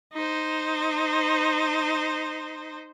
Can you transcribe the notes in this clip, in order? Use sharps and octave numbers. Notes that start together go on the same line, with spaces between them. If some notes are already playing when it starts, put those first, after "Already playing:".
D#4 C5